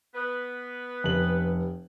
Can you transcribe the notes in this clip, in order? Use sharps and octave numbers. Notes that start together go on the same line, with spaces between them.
B3 B4
F1 F#7